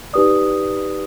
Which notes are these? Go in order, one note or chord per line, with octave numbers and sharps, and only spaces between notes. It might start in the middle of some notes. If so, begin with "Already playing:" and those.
D#4 G4 B4 D5 D#6